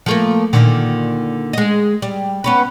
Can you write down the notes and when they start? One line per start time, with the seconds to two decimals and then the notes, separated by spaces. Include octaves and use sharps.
0.06 F3 A3 A#3
0.53 A#2 D3 D#3
1.53 G#3 D#5
2.02 G3
2.44 B3 C#4 B4